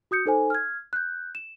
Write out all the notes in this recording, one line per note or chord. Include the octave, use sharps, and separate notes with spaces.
F#4 D#6 G6 C#7
D#4 A4 C5 G#5
F6 G#6
F#6 G6
E7